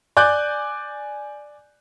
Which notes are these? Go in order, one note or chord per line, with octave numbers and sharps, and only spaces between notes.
D5 G#5 D6 F#6 G6